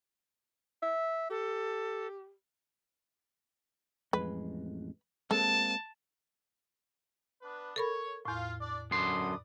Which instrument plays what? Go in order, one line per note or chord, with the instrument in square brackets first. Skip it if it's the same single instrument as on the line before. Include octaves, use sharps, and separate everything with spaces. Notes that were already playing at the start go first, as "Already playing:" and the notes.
[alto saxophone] E5
[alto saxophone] G4 [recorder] A4
[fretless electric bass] A1 F2 G#3 [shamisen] B4
[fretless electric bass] G#3 A#3 C4 [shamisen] A4 [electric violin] A5
[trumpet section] B3 D4 B4
[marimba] A4 A#4 B5 [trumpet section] C#5
[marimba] E2 A2 [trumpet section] F4
[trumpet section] D4 D5
[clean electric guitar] F#2 D3 C6 [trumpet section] B4 D5 D#6